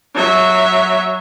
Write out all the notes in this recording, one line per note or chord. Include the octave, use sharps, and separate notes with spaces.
F#3 E5